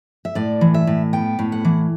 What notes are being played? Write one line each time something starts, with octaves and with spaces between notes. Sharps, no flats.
E5
A2 D5
E3
E5
A2
B3 G5
A2
F#5
E3